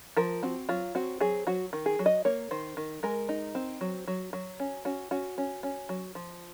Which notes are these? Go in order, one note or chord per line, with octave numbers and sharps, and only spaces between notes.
F3 A#4
C4 F#4
F#3 F4
C4 F#4
F#3 G#4
F#3 F#4
D#3
G#4
F#3
D#5
A#3 C#5
D#3 C5
D#3
G#3 A#4
D#4
C4
F#3
F#3
F#3
C#4
C#4 F#4
C#4 F#4
C#4
C#4
F#3
F3